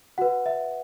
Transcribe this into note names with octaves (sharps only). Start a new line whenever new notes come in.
F#4 B4 F#5
E5